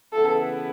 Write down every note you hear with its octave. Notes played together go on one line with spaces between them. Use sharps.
C#3 E3 B3 E4 A4